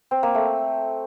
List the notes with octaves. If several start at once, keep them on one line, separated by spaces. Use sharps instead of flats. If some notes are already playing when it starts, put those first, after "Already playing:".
C4
A#3
A3